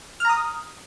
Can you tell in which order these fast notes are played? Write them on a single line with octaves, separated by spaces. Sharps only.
F6 A#5 D#6